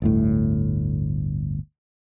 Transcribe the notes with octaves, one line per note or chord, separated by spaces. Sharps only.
G1 D2 A2